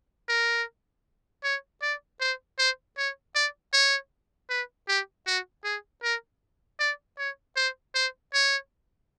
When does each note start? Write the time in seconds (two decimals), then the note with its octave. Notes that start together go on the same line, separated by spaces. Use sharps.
0.28 A#4
1.44 C#5
1.82 D5
2.21 C5
2.59 C5
2.98 C#5
3.35 D5
3.73 C#5
4.50 B4
4.88 G4
5.27 F#4
5.64 G#4
6.03 A#4
6.79 D5
7.18 C#5
7.56 C5
7.95 C5
8.33 C#5